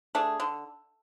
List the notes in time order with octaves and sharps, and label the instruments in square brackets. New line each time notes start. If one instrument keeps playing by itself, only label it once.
[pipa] A3 D4 G#4
D3